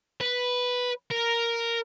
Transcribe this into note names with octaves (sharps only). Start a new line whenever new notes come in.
B4
A#4